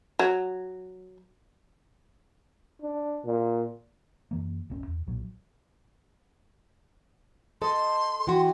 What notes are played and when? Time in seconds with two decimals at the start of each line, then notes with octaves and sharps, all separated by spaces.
0.19 F#3
2.82 D4
3.25 A#2
4.31 F#2 E3 A#3
4.70 D1 G1 C4 C#4
4.88 E2
5.07 B1 A#2 F#3
7.62 A4 D#5 C6
8.27 E3 F#4 G4